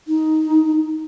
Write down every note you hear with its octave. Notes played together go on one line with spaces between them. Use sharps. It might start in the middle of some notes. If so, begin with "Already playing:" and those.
D#4